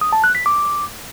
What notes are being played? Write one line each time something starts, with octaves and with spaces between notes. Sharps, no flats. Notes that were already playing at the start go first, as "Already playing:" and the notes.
D#6
A5
F#6
B6
D6